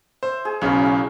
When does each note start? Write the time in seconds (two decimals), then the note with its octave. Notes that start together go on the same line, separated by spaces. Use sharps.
0.23 C5 E5
0.45 G#4
0.61 B1 C#3 C#4 E4 C5
0.86 C#6